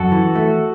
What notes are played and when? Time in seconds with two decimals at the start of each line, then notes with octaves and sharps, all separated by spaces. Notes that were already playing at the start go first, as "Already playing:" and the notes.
Already playing: F#2 F#4 A4
0.12 E3
0.35 A3